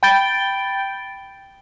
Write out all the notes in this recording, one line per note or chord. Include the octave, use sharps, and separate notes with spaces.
G5 B5 G6 A6 D7 G7